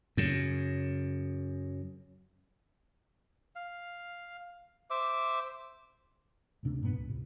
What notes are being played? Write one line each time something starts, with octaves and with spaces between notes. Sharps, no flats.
F#2 C#3
F5
C5 E5 D6
D1 D2 C3 D4
G2 A#2 B3
C#2
A2 C3